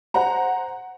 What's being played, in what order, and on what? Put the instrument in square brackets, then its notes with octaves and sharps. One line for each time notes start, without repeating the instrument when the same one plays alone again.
[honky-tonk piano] C5 F#5 A#5